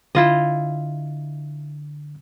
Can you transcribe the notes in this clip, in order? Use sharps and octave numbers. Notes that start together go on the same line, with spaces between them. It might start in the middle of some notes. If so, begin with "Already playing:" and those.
D3 E4 F4 D#5